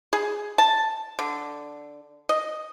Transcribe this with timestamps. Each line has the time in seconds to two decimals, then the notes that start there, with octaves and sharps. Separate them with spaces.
0.13 G#4
0.58 A5
1.19 D3
2.29 D#5